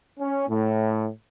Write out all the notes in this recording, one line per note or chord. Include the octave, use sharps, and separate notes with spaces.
C#4
A2